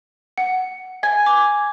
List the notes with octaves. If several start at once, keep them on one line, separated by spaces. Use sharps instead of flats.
F#5
G#5
D6